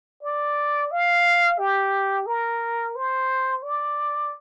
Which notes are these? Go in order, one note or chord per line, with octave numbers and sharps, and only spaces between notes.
D5
F5
G4
A#4
C5
D5